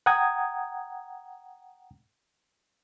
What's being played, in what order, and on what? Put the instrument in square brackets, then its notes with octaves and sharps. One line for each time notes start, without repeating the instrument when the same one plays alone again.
[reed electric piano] F#5 G5 A#5 D#6 G#6